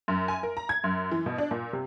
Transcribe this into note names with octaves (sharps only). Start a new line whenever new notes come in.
F#2
G#5
A#4
A#5
G#6
F#2
E3
B2
D4
A#2
C3